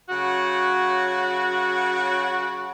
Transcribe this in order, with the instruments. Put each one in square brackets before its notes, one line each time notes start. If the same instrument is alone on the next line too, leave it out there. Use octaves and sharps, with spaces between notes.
[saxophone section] C#3 F#3 F#4